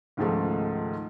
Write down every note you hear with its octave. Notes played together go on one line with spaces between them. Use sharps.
C#2 G#2 D#3 F3 A3